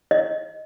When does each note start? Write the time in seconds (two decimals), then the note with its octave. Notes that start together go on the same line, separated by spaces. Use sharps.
0.11 D#5